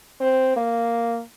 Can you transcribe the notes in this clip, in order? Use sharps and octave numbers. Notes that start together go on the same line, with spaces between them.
C4
A#3